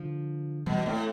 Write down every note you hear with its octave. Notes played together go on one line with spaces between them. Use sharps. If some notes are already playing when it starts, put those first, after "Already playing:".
Already playing: D3 F3
B2 E3 G3
B3
A2 A3 C4